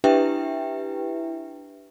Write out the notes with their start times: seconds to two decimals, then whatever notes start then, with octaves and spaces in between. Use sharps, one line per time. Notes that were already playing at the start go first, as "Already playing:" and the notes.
0.04 D4 E4 G4 B4 E5 G5